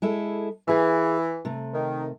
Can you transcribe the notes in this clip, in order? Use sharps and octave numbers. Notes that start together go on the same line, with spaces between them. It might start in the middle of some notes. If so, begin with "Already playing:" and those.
G#3 E4 A4
E3 G#4 F5
C3 A3
D#3